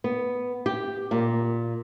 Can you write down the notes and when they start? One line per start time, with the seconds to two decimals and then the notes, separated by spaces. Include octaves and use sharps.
0.04 B3
0.66 G4
1.11 A#2